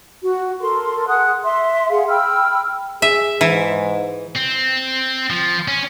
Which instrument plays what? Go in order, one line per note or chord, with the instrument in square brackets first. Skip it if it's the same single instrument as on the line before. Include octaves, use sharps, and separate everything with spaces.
[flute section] F#4
A4 A#4 C6
G#4 F#5 D#6 F#6
E5 C6
G#4 F5 F#5
G5 B5 E6 F6
[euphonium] G#4 [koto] E5
[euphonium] G#2 [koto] E3
[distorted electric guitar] C4
F3
C#4